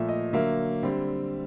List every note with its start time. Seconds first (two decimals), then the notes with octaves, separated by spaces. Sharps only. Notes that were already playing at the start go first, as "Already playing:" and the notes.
Already playing: A#2 F3 A3 E5
0.09 D#5
0.33 D3 F#3 A#3 E5
0.83 D3 G3 C4